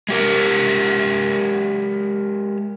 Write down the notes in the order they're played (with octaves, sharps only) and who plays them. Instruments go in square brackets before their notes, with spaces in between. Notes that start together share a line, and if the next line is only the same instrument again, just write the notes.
[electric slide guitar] G#3 G4 A#4